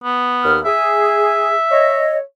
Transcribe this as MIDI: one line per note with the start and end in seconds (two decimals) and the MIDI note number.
0.04 0.58 59
0.43 0.59 39
0.43 0.59 89
0.65 1.55 68
0.65 2.20 76
1.70 2.17 73
1.70 2.17 75